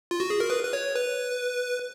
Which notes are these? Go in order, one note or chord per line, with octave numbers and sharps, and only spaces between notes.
F4
F#4
G#4
A#4
B4
B4
C#5
B4